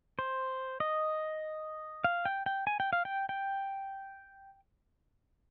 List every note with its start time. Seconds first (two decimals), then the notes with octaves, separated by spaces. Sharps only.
0.19 C5
0.80 D#5
2.04 F5
2.25 G5
2.46 G5
2.67 G#5
2.80 G5
2.93 F5
3.05 G5
3.29 G5